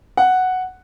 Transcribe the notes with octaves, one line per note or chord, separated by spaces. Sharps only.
F#5